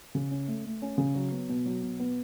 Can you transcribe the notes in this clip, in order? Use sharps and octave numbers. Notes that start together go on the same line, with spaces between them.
C#3
C#4
A3
A3
C#4
C#3
F#3
B3
B2
F#3
B2
B3